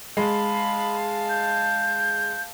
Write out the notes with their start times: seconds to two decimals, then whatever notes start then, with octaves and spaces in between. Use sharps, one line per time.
0.17 G#3 F5 A5 B5
1.29 G6